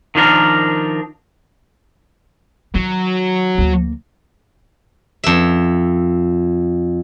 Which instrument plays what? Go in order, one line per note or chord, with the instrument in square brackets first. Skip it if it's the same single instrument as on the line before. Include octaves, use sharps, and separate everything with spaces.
[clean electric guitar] D#3 F3 D4 A#4
[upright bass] D#3 [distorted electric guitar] F#3
[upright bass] D2 A#3
[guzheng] F2 E5